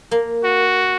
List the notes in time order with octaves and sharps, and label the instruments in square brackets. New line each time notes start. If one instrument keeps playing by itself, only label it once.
[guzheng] A#3
[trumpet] F#4